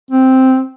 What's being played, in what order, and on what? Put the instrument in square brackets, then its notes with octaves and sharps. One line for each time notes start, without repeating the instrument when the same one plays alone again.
[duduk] C4